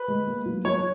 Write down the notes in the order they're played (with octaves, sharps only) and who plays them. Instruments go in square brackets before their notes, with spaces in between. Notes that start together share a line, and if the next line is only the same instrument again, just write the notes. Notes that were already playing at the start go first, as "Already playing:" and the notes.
Already playing: [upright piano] B4
[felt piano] G#3
A#3
F#3
[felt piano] F#3 [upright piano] C#5